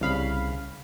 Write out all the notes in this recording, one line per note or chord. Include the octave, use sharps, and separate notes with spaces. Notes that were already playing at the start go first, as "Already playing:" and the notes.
C2 C#3 F5 B5